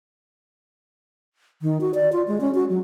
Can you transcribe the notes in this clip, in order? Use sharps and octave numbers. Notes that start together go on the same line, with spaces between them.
D#3
F#4
D5
F4
G#3
C#4
F#4
F#3